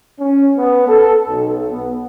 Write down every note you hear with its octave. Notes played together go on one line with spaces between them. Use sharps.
C#4
B3
A4
B1
B3